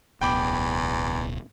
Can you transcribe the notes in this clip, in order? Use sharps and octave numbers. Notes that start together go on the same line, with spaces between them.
D1 B1 E2 B2 G5 B5 D6